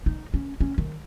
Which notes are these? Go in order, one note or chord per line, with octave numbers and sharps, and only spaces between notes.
D#4
C#4
C#4
D#3